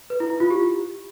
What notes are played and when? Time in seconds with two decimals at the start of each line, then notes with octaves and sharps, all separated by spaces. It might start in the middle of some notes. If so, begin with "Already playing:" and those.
0.10 B4
0.20 E4
0.30 E4
0.40 F4
0.50 G4